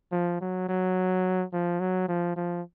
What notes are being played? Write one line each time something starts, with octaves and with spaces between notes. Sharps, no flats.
F3
F#3
F#3
F3
F#3
F3
F3